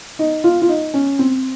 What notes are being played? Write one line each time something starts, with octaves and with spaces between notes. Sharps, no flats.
D#4
F4
F4
D#4
C#4
C4